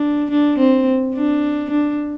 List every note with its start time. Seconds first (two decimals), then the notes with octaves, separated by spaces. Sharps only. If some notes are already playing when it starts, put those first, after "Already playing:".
Already playing: D4
0.31 D4
0.59 C4
1.14 D4
1.71 D4